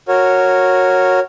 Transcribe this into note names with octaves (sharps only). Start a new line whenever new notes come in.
F#4 A#4 C#5